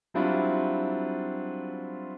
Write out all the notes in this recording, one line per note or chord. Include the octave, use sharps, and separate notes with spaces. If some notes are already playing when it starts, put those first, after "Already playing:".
F#3 G3 C4 D4 E4 F4